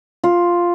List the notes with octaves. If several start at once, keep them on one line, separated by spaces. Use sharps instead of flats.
F4